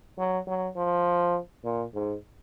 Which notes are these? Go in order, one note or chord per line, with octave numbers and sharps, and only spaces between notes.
F#3
F#3
F3
A#2
G#2